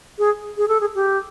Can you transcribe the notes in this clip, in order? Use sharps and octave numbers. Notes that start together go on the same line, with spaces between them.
G#4
G#4
A4
G#4
G4